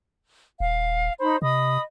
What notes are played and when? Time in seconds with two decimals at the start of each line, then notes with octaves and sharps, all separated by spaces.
0.60 D#1 F5
1.20 D#4 C5 B5
1.42 C3 D#5 B5 D#6